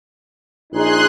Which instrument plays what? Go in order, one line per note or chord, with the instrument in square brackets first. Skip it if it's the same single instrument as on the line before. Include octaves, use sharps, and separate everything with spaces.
[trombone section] A#1 D#4 [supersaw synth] G#4 C6 F#6